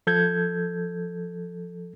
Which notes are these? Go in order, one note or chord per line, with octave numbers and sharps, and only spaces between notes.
F3 A4 G6 G#6